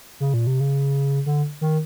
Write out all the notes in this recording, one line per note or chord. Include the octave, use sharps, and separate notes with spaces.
C#3
A#2
C3
C#3
D3
D#3